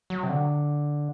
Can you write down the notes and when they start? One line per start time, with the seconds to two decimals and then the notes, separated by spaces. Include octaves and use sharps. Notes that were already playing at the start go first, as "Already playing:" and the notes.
0.10 F#3
0.23 C3
0.29 D3